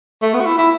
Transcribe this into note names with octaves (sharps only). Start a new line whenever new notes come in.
A3
B3
F#4
E4
E4